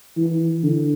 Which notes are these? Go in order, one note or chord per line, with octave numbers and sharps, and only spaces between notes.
E3
D3